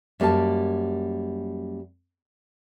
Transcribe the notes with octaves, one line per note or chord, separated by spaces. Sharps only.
F#2 G3 A#3 A4 A5